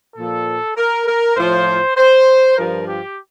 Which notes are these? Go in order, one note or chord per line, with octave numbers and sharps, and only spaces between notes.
A#2 F3 A4
A#4
A#4
A2 F3 C5
C5
G2 F3 A#4
G4